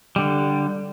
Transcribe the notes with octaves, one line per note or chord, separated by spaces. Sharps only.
D3 G3